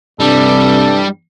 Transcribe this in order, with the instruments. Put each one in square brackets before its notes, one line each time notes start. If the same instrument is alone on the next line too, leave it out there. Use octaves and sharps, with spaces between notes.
[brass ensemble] G2 E3 D4 [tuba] C3 [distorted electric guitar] G3 [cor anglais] A4